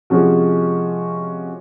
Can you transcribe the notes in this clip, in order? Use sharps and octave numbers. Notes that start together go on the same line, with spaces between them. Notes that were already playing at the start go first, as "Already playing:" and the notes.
C3 F3 G#3 C#4 F#4